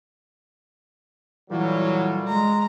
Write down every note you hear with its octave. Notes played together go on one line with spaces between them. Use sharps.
A#2 D3 E3 F#3 G3
G#3 A#5